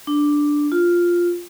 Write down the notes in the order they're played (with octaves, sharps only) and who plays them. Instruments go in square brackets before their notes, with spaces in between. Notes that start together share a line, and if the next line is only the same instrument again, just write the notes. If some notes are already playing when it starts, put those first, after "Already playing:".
[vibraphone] D4
F4